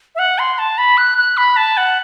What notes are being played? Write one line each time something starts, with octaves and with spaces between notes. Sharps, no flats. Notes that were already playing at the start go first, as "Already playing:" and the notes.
E5
F#5
C6
A5
B5
F#6
F#6
B5
A5
F#5